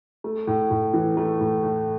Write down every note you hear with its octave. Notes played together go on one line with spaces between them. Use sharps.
A3
A2
A2
E3
A3
A2
A2